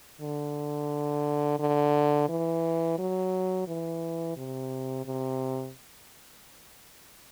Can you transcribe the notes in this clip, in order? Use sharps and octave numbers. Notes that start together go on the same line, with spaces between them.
D3
D3
E3
F#3
E3
C3
C3